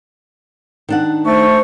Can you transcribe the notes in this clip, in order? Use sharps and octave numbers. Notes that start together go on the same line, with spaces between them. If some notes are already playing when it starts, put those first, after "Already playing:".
D#3 D4 F#5
A3 C5 C#6